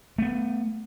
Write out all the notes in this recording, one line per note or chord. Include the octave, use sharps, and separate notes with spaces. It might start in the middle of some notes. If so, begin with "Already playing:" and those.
A3 B3